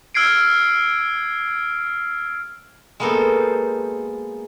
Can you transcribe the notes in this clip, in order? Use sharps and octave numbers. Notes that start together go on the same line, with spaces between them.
E6 F6 G#6 C7 D7
G#3 A#3 B3 F#4 A4 C5